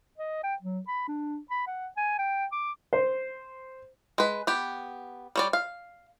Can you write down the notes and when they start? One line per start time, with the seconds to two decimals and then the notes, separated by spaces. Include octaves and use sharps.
0.18 D#5
0.43 G5
0.62 F#3
0.87 B5
1.08 D4
1.50 B5
1.67 F#5
1.97 G#5
2.18 G5
2.52 D6
2.93 C5
4.18 G#3 B4
4.47 B3 G4
5.36 G3 C#5 D5
5.53 F5